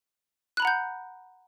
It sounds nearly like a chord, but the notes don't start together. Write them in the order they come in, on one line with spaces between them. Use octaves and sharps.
F#6 B5 A#5 F#5 G6